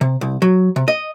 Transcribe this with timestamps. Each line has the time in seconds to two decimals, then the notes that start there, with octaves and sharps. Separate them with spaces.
0.01 C3
0.21 C2
0.42 F#3
0.76 C3
0.88 D#5